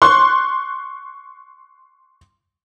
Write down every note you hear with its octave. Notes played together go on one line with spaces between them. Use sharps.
C6 C#6 F#6